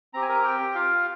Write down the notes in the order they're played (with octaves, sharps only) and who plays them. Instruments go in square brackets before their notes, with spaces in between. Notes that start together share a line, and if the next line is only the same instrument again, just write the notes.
[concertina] C4 G4 A#5
G#5
A#4 A#5
G4 G5
F4 F5